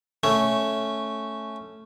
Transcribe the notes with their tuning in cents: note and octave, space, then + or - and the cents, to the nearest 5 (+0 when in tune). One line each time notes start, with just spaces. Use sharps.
A3 +0 C#4 +0